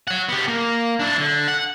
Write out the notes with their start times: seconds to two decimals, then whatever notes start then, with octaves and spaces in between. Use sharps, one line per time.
0.07 C#5 F#5
0.29 B3 G4
0.48 A#3
0.99 D4 E4
1.18 D3
1.48 F#5